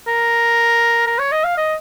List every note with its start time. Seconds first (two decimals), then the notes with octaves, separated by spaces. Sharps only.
0.07 A#4
1.07 A#4
1.19 C#5
1.32 D#5
1.44 F5
1.57 D#5